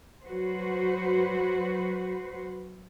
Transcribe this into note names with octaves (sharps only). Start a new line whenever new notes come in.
F#3 F#4 B4 C5